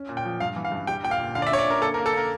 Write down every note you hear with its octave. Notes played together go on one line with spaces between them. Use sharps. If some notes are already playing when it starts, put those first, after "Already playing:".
Already playing: C#4
A#2
G5
F3
G2 F5
E3
F5
G2
G3 G5
A#2 G5
F5
A#2
D3 F5
D5
E5
D4 C#5
D5
D4 A#4
A#3 A4
A#4
A#3
A4
A#3 A#4